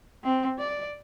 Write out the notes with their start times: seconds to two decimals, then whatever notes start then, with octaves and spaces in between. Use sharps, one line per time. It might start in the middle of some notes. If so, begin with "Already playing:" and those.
0.24 C4
0.59 D5